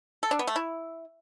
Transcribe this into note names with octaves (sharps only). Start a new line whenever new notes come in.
A4
D4
B3
A3
E4